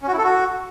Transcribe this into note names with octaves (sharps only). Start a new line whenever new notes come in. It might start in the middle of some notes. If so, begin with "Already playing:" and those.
C#4
F#4
E4
A4
F#4